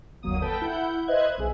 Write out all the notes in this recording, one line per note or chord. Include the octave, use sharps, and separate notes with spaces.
G1 D#2 F#3 A#3 D#6
A4 B4 G5 A5 B5
E4 F#5 G6
B4 C5 D#5 E5 F#6 G#6
B1 G#4 E5